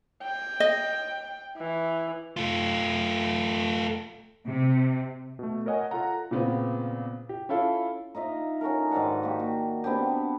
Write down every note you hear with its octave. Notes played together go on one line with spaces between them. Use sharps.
G5
D#5
E3
A3 F4
C3
B2 A3
A#4 C#5 D#5 F#5 G#5
F4 A4 F#5 A#5
A#2 C#3 B3 C4 F4
G4
C#4 E4 F4 A4 F5
D#4 F4 D#5 E5
C#4 F#4 A4 A#4
G#2 D#3 D5 F#5
A#3 G4
F#4
B3 C4 D4 G4